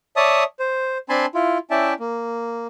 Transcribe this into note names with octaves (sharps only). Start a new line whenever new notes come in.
C#5 D5 E5 A5 D#6
C5
C4 D4 G#5 A5 B5 C6
E4 F4
C#4 E4 D5 E5 G5 A5
A#3